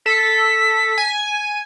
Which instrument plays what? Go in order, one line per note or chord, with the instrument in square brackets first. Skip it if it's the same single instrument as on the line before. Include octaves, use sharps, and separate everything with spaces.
[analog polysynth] A4 [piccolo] B6
[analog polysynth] G#5